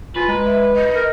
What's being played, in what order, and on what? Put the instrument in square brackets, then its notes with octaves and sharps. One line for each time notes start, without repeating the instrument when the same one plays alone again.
[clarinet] F4 [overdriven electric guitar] B4 [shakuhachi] G#5
[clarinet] G#3 [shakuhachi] A#5
[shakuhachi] E5
D#5
[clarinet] A#4